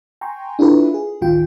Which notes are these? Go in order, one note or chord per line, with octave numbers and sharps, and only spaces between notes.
G5 G#5 A#5 C6 C#6
D4 E4 F4 G4 A4 B4
G#4
A1 D2 D#3 F4 G5